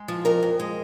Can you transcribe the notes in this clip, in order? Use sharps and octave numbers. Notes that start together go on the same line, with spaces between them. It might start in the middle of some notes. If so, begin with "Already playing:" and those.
Already playing: G#3
F3
F2 A#4
F2
G#3